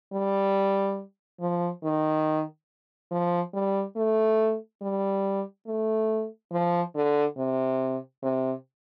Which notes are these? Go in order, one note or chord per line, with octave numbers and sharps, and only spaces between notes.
G3
F3
D#3
F3
G3
A3
G3
A3
F3
D3
C3
C3